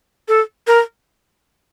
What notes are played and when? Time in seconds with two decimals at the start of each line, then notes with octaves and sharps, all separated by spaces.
0.28 A4
0.67 A#4